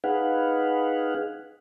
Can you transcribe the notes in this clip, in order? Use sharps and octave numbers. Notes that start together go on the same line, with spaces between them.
D#4 G#4 B4 F5 F#5